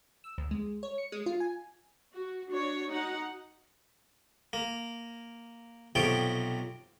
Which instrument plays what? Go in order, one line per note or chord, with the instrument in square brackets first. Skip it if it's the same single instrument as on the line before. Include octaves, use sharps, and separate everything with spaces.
[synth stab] E6
D2
G#3
C#5
C#7
G#3
F4
G#5
[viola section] F#4
D4 F#4 C#5
D#4 F#4 F#5
[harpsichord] A#3
B1 C3 F3 A4 C#5 G5